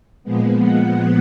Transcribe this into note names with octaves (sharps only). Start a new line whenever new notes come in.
A#2 F3 G#3 B3
F#5